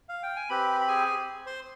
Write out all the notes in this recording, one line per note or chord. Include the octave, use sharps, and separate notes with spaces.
F5
G5
G#5
C4 G4 B4 B5
B5
G#4 G#5
C5 C6